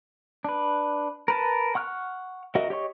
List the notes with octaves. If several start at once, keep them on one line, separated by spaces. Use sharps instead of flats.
D4 B4
A#4 B4 A5
F#5 C#6 F6 F#6
F#4 A#4 D#5 E5 F#5
G4 C#5 D#5 C#6